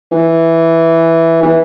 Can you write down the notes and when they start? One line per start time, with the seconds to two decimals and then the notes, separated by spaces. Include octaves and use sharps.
0.12 E3
1.43 E3